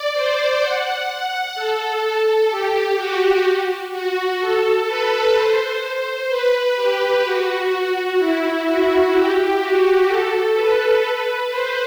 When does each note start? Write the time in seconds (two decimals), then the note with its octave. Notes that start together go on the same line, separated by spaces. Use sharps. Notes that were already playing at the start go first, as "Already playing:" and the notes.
Already playing: D5
0.13 C5
0.60 F#5
1.08 F#5
1.55 A4
2.50 G4
2.97 F#4
3.92 F#4
4.40 A4
4.87 B4
5.34 C5
5.82 C5
6.29 B4
6.76 G4
7.24 F#4
7.72 F#4
8.18 E4
8.66 F#4
9.14 G4
9.61 F#4
10.08 A4
10.56 B4
11.04 B4
11.50 C5